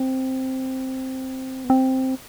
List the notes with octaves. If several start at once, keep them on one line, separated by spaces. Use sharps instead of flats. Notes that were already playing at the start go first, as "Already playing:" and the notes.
Already playing: C4
B3
C4